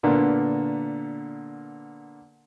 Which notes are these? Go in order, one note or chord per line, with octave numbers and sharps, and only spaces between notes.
A#2 D3 A#3 B3